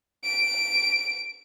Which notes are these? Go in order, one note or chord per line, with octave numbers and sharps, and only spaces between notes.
D7